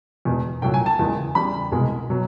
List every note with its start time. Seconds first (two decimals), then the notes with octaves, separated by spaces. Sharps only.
0.25 E2 B2 G#3
0.62 C2 A#2 F#3 A3 G5
0.74 G#5
0.86 A5
0.99 F#1 E2 C#3 E3 G#3
1.35 E2 C#3 E3 G3 B5
1.72 C2 B2 G#3
2.10 B2 F#3